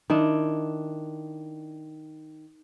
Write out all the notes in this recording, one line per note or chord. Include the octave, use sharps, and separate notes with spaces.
D#3 D4 E4